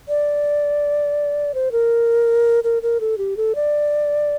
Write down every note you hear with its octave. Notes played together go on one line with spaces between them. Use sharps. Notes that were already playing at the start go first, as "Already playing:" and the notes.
D5
C5
A#4
A#4
A#4
A4
G4
A4
D5